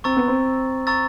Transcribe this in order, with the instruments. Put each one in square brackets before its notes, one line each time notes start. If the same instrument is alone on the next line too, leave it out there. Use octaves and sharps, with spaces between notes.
[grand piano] C4 [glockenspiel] A#5 C#6 E6 A6
[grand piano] B3
C4
[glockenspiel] A#5 C#6 E6 A6